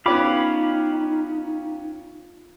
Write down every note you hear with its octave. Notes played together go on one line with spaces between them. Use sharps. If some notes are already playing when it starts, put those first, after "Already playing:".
B3 C#4 D#4 F4 G4 F5 B5 D6